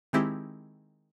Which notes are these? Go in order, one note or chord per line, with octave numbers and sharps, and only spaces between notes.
D#3 G#3 C4 E4 G4